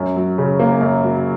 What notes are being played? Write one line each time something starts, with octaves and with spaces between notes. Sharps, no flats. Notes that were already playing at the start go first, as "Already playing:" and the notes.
Already playing: F#2
F#3
C#3
A#3
F#2
F#3